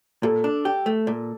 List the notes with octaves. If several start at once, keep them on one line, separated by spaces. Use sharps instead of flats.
A#2 A4
D4
G4
A3
A#2